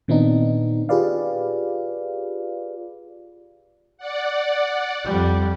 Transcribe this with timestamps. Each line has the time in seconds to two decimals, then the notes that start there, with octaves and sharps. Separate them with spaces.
0.08 A#2 D#3 B3 C4 D4 D#4
0.89 F4 G4 G#4 B4 D5 F5
3.98 D5 F#5
5.05 F2 G3